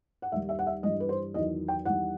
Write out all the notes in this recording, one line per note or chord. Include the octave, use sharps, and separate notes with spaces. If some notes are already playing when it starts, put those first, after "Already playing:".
F#5
D#2 D#3 G3 E5
E5
F#5
E5
G2 E3 G3 D#5
B4
C5
E2 D#3 F#3 D#5
G5
E2 D#3 G3 F#5